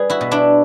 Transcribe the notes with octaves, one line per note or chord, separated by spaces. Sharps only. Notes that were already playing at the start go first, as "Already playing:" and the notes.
Already playing: G3 G#4 B4
E4 F#4
B2
D4 E4